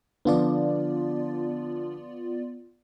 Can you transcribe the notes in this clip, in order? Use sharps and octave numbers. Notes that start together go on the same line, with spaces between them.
D3 F3 B3 F4 D5